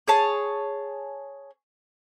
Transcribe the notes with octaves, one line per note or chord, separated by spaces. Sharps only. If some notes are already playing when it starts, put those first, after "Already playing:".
G#4 C#5 A5